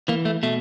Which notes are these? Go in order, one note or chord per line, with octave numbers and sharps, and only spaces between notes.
E3 A#3
A3
B2 A3